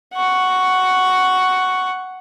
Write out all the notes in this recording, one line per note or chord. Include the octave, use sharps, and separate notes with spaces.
F#5 C#6